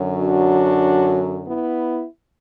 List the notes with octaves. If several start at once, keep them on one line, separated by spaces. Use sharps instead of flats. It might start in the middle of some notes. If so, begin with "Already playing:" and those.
Already playing: F#2 D3 F#3
D4 F#4
B3 E4